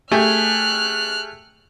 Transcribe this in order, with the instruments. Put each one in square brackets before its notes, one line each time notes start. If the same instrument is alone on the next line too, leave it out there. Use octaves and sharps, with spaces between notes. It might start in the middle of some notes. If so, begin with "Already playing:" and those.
[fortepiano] A3 G4 G#4 [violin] F6 F#6